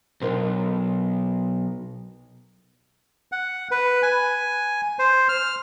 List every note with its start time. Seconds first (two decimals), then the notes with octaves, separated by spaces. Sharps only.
0.21 B1 D4 A#4 C5
3.32 F#5
3.71 B4
4.03 G#5
4.99 C5
5.29 F6